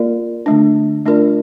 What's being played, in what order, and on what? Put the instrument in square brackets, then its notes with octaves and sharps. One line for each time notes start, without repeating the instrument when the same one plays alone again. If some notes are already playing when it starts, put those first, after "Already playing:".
Already playing: [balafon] A#3 F4 A#4 D5
D3 A3 D4
A3 D4 F4 A#4 D5